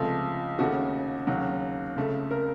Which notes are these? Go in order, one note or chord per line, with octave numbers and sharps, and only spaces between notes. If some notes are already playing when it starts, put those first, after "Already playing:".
Already playing: C#2 C3 F3 A3
D#2 C#3 A3 F#4
D#2 C#3 F#3
C#2 C#3 A3
A#4